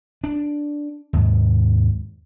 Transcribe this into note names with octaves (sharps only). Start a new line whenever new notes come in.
D4
D#2 G#2